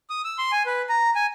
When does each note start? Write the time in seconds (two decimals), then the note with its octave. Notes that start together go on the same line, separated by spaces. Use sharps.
0.10 D#6
0.24 E6
0.38 C6
0.52 G#5
0.66 B4
0.89 A#5
1.16 G#5